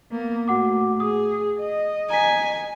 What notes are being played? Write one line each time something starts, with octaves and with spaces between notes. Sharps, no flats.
A#3 B3
A2 F#4 F#5 D6
G#4 D#6
D#5
G#5 A#5 B6